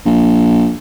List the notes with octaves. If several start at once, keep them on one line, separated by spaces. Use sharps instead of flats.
A#1